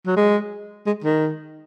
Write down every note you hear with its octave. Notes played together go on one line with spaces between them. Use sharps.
F#3
G#3
G#3
D#3